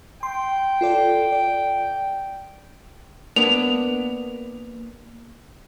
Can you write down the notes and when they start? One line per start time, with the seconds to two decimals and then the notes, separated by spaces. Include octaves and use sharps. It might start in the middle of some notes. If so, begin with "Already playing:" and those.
0.23 G5 C6
0.81 F4 A4 D5
1.32 D5
3.36 A#3 B3 D4 F7